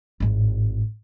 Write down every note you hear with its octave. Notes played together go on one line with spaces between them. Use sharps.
G#1 A2